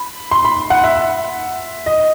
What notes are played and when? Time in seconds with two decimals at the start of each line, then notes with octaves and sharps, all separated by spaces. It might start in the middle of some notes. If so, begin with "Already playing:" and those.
Already playing: B5
0.31 C6
0.45 B5
0.70 F#5
0.84 E5
1.86 D#5